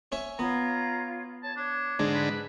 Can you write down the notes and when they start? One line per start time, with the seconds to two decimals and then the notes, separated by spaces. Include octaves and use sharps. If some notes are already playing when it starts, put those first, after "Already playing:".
0.12 C#4 C#5 E5
0.39 B3 F4 C#5 F5 A#5
1.43 C#5 A5
1.57 D4 C#5
1.99 G#2 D3 G#3 D4
2.15 B4